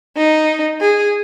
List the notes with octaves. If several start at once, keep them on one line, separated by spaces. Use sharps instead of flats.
D#4
G#4